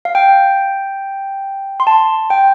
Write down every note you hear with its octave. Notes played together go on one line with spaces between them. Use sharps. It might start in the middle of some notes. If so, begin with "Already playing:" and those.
F5
G5
C6
A5
G5